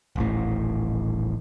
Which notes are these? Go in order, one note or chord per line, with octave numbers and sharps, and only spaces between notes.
D#1 A1 A2